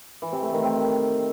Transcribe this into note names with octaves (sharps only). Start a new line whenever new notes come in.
E3
C3
A3
D#3
C4